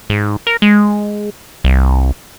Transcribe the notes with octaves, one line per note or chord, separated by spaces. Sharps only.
G#2
A#4
G#3
C2